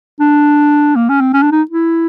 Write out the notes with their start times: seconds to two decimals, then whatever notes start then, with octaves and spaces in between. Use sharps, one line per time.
0.20 D4
0.95 A#3
1.09 C#4
1.20 C4
1.33 C#4
1.42 D4
1.52 D#4
1.71 E4